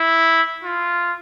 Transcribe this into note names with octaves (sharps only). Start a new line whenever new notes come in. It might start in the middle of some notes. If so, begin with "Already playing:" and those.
Already playing: E4
F4